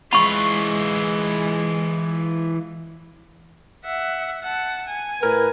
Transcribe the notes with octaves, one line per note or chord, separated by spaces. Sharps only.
E3 G#3 F4 B5 C#6
E5 F#5
F#5 A5
G#5
A2 A#4 B4